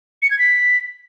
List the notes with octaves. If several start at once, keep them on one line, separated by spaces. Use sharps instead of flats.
C#7
G#6
B6